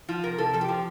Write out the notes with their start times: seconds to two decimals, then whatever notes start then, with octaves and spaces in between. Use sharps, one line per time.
0.09 F3 F4
0.23 C3 A#4
0.38 C3 A4
0.53 F3 A4
0.61 G4
0.68 F3